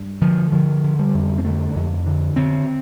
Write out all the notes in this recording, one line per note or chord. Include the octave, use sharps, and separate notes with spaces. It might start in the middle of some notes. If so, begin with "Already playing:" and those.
Already playing: G2
D3 F3
D3 F3
D3
G3
F2
C4
D3 A3
F2
D3
D3 C4